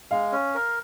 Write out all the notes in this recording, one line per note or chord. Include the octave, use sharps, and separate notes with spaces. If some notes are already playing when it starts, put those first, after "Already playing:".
G#3 F5
C#4
A#4